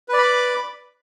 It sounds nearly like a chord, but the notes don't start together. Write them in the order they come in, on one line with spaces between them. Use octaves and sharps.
B4 D5 B5 D6